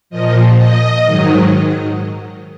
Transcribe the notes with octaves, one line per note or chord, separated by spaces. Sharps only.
A#2 F3 D#5
D#5
G#2 D#3 F#3